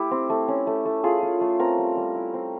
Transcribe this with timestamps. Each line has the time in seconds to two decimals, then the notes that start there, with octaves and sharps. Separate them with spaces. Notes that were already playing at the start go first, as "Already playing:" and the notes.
Already playing: A3 E4 G4
0.11 C4
0.30 A3
0.48 C#4
0.67 A3
0.85 A3
1.04 F4 G#4
1.22 C#4
1.41 A3
1.59 C4 A#4
1.79 G3
1.97 G3
2.15 E4
2.34 C4